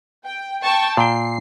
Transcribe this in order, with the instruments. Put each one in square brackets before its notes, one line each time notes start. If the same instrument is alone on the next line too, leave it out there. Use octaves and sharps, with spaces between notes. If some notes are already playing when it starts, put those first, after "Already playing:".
[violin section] G5
G5 A5 C#6
[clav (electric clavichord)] A#2 G5 [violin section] C7